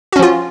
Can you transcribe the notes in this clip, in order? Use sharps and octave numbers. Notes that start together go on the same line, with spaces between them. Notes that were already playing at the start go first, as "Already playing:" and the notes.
F3 C#4 F4 F#4